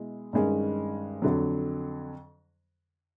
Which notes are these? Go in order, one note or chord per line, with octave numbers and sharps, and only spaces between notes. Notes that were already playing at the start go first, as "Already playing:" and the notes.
Already playing: B2 G#3 E4
G2 D#3 G#3 C#4
F2 D3 F#3